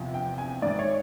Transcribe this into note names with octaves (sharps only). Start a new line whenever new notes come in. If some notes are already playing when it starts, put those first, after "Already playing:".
Already playing: E2 C3 F3
G5
G#5
G#2 D#3 D5
C#5